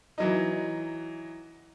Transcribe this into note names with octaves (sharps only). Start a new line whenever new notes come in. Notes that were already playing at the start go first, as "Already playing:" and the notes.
E3 F#3 D#4